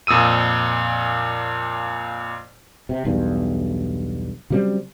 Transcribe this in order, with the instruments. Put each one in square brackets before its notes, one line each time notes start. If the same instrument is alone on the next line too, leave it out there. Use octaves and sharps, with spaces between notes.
[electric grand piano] F2 A#2 D#6 E6 D#7
[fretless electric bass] C3
B1 E2 G2
C#3 F#3 G3 C4